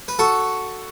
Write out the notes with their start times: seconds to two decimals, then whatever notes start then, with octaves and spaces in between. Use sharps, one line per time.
0.08 B4
0.19 F#4 A4